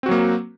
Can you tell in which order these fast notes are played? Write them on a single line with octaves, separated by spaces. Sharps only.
C4 F#4 F#3 A#3